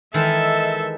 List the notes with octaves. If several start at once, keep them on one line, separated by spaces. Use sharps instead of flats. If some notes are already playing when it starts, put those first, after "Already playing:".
D#3 E3 G#3 A4 E5